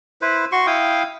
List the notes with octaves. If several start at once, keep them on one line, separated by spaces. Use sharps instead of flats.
E4 B4 C5
F#4 C6 C#6
E4 F5 G5 D#6